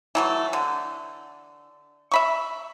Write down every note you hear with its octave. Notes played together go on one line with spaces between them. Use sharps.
E3 F#3 A3
D3
E5 B5 C#6